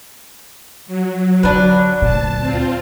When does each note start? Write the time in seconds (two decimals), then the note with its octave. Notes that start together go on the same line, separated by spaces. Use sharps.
0.86 F#3
1.43 D3 D4 B4
2.02 D2 A#2 A5
2.40 C4 F4